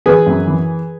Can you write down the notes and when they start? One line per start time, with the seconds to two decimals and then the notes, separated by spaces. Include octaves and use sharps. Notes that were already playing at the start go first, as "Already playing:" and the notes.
0.06 E3 G#4 B4
0.26 F#2
0.47 E3